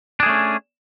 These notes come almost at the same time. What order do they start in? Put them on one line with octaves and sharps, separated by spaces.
D4 G#4 A3 C#4